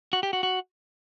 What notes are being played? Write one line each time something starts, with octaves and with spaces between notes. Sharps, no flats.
F#4
G4
F#4
F#4